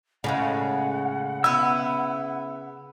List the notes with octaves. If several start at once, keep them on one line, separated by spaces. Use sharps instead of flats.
A2 C#3 E3 G#3 F#5
B3 E4 E6